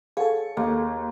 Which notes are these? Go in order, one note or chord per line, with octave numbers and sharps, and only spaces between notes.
G#4 A4 F5 F#5 C#6
D#2 A#3